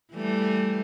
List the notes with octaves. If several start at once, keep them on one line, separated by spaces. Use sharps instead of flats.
E3 G3 A3